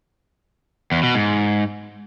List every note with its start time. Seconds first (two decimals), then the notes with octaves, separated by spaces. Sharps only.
0.92 E2
1.03 B2
1.15 G#2